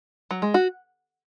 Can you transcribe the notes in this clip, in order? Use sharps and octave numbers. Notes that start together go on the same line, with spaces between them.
F#3
G#3
F#4